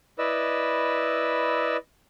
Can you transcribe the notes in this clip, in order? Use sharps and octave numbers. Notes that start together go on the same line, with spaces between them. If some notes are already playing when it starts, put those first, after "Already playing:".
E4 B4 D5 D#5 E6